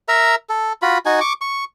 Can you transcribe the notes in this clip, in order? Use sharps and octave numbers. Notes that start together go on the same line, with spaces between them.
A#4 E5 A#5
A4
F4 F#4 B5
D#4 F#4 G#5
C#6 D6
C#6